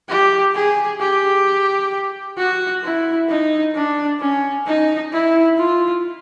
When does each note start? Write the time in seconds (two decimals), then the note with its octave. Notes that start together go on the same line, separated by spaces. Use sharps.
0.09 G4
0.55 G#4
1.00 G4
2.37 F#4
2.83 E4
3.29 D#4
3.74 D4
4.20 C#4
4.66 D#4
5.12 E4
5.58 F4